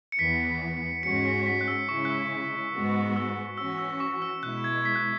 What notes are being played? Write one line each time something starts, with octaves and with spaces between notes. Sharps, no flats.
C#7
E2 E3 B3 B6
G#2 G#3 C#4 F#4 C#7
B6
B6
F#6
E6
C#3 G#3 C#4 E4 C#6
F#6
E6
G#2 G#3 B3 F#4
E6
E3 C#4 F#4 E6
E6
C#6
E6
B2 G#3 E4 F#6
G#6
B6
F#6